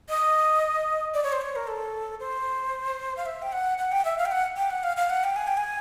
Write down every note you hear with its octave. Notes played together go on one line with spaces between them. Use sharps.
D#5
D5
C#5
C5
C#5
A#4
A4
C5
F5
E5
G5
F#5
F#5
G5
E5
F5
G5
F#5
G5
F#5
F5
F5
F#5
G5
G#5
G5
G#5